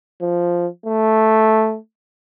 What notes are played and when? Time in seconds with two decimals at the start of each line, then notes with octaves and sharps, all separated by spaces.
0.22 F3
0.86 A3